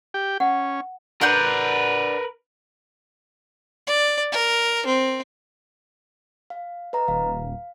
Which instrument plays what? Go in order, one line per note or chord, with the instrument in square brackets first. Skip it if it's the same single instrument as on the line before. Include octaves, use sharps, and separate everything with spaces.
[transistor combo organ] G4 G5
[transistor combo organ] C#4 [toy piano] F#5
[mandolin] D4 F#5 G6 [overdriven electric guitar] A#4 B4
[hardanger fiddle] D5
A#4
C4
[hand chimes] F5
B4 D#5 A#5
[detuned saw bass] D#1 [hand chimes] F5